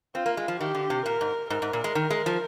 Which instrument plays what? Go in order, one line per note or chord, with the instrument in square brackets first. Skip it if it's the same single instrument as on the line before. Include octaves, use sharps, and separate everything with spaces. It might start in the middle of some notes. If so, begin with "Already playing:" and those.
[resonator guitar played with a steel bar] C4 [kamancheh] F4
[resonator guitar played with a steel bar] A#3
G#3
F3
[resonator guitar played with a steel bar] D#3 [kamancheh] G4
[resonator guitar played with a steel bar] D3
C3
[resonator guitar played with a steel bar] A#2 [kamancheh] A#4
[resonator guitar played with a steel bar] G#2
[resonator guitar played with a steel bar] G#2 [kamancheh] A#4
[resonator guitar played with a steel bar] G#2
A#2
G#3
D#3
G#3
F3